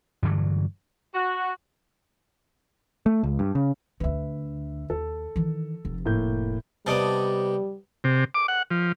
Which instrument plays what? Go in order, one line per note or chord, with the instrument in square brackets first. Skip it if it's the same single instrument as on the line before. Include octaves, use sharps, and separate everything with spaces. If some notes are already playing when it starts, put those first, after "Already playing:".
[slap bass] G2 D3 E3 F#3
[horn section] F#4
[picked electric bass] A3
C#2
G2
C#3
[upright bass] D2 D3 [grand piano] B4 E5
[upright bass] D#2 [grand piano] A4
[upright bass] D#3 E3
F1
[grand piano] A2 A#3 G6
[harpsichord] C3 B3 [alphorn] G3 [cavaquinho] D5 D#5 A5
[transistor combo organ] C3
D6
F#5
F3